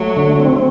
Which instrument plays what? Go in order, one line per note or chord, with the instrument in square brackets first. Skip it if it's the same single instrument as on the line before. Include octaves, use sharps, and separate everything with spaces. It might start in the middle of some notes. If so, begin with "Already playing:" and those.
Already playing: [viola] F#3 [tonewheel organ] A3
[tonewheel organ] D3
C4